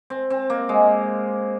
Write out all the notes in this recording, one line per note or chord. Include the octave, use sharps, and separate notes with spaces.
C4
C4
A#3
G#3